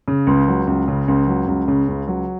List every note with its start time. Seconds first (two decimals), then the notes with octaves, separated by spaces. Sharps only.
0.08 C#3
0.27 C#2
0.48 F#3
0.67 C#2
0.88 C#3
1.08 C#2
1.27 F#3
1.47 C#2
1.68 C#3
1.88 C#2
2.08 F#3